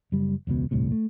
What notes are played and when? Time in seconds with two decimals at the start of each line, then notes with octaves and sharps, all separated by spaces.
0.12 F#1 G3
0.47 E1 C#2 G#2 B2
0.71 D#1 C2 A2 C3
0.92 A3